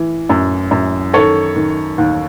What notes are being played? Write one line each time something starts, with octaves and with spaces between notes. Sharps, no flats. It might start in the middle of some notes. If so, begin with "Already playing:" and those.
Already playing: E3
F#2
F#2
D#3 A4 C#5
D#3
D#2